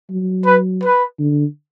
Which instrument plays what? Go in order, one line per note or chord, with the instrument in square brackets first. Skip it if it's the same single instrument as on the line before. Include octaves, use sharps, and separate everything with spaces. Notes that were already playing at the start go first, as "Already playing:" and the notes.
[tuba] F#3
[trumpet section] B4
B4
[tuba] D3